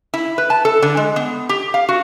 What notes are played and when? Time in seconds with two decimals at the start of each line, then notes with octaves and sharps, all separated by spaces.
0.14 E4
0.38 B4
0.50 A5
0.65 A4
0.82 D3
0.97 G#3
1.16 B3
1.49 G4
1.74 F5
1.89 F#4